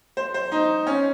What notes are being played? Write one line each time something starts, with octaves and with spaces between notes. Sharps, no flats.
C5
C5
D#4
C#4